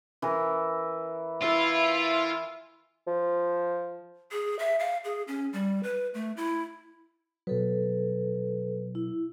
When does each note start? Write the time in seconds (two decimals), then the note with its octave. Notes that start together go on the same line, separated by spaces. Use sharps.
0.22 E3 E4 A#4
1.42 E4 F4 B4 E5
3.07 F3
4.31 G#4
4.59 E5
4.79 F5
5.04 G#4
5.28 C#4
5.53 G3
5.83 B4
6.14 A3
6.37 E4
7.47 B2 F#3 A4 B4
8.95 E4